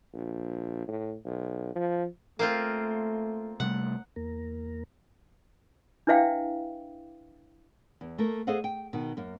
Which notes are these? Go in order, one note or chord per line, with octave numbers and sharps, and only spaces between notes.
A#1
A2
B1
F3
A3 A#3 C4 F4
C3 G3 A3 F#5
E2 A#3 A#4
D4 E4 B4 E5 F5 G5
E2
A3 A#3 A#4
G#4 A4 C5 D#5 F5 F#5
G5
B2 D#3
F#2 A#3